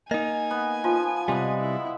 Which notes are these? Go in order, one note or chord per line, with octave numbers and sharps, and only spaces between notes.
A#3 D#4 D#5 G#5
B3
F3 F4
C3 G3 G#3 B3
E4